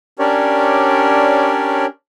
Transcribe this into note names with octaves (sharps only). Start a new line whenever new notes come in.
C#4 D4 G4 A#4 C#5 D5